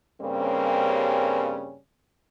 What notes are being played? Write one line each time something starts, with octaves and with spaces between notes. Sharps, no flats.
G2 C#3 G3 A#3 C4 C#4